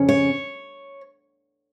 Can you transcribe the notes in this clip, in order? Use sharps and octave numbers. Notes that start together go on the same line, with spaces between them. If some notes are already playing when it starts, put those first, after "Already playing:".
Already playing: F2 C#3 C#4
C#5